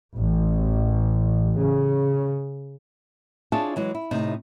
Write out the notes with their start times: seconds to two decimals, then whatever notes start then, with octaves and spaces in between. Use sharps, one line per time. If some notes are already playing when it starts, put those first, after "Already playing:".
0.16 A1
1.56 C#3
3.52 D4 E4 F4 G#4 C#5 A5
3.76 E3 F#3 G#3
3.95 E4
4.11 A2 C3 D#4